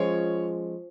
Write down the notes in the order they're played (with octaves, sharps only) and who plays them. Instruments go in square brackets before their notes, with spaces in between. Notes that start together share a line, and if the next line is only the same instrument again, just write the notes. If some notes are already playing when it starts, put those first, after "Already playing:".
Already playing: [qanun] F3 G#3 C#4 [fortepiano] C#5